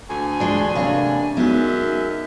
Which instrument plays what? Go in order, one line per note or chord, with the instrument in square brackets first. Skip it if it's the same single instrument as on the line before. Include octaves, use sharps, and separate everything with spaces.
[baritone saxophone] D2 [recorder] G#5
[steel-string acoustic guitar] E3 G#3 D4
[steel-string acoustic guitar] C3 A#3 D4 [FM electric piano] C#5 F5 B5
[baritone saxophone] F#2 [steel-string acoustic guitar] G#3 [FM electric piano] B3 D#4 [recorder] E5